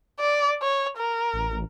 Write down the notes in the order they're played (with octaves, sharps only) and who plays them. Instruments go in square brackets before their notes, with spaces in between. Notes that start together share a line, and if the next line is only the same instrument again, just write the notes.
[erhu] D5
C#5
A#4
[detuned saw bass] A1